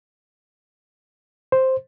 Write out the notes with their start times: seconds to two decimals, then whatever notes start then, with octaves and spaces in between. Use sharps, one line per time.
1.52 C5